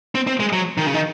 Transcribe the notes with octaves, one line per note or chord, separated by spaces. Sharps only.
C4
C4
G#3
F#3
D#3
C#3
D#3